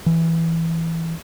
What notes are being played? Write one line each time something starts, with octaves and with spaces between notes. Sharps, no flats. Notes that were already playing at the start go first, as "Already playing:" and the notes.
E3